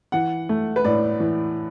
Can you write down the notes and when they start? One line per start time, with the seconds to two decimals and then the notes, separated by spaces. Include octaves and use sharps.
0.12 E3 F#5
0.49 A3
0.76 B4
0.85 A2 D5
1.20 E3